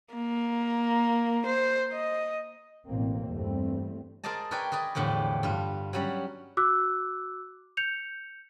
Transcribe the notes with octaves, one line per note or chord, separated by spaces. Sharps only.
A#3
C5
D#5
A1 B2 A#3 C4
E2 G2 G3 A3 C4
G#4 A#4 C5 D5 D#5 A5
A#4 B4 C#5 D5 G5 G#5
G#4 B4 D5 D#5
E2 A2 D3 F3 G4
G2 F4
F#3 G3 C#4
F#4 D6 E6 F#6
G6 C#7 F7